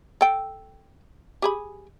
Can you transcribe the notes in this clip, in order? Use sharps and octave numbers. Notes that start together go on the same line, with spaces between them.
A4 G5
G4 G#4 B5